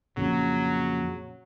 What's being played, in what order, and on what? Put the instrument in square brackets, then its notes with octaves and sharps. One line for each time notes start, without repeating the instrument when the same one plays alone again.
[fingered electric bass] F2 A#2 C#3 [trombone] F#3